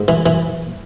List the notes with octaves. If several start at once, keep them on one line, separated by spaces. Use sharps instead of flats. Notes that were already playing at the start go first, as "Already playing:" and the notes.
Already playing: G#2
E3
E3